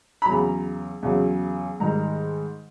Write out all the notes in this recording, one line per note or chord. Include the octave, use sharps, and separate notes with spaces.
B5
E2 C#3 F#3 A#5
E2 C#3 F#3
G#2 D#3 G3 A#5